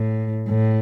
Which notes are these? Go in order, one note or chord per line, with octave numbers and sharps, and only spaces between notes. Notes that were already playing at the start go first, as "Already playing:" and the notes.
Already playing: A2
A2